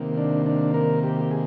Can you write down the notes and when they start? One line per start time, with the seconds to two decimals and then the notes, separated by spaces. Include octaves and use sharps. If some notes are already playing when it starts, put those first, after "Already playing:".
Already playing: C3 D#3 A#3
0.17 D4
0.46 D4
0.74 A#4
1.03 G4
1.21 G4
1.31 G#4